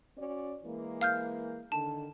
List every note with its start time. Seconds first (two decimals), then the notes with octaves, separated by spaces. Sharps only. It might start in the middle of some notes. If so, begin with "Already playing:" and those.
0.18 C#4 F#4 D5
0.64 E3 G#3 A#3
1.01 F5 F6 G6
1.72 D3 D#3 A5